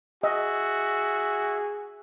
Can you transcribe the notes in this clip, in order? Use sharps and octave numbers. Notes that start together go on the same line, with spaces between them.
F#4 G#4 D#5 E5